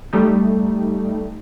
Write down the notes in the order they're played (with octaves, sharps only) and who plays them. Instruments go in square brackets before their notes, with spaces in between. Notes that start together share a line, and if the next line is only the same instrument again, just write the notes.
[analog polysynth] G3 A3 D#4